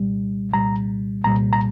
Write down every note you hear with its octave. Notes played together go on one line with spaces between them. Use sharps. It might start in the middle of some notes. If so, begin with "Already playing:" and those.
Already playing: C2 A#2 G3
C2 A#2 G3 A#5
C2 A#2 G3 A#5
A#5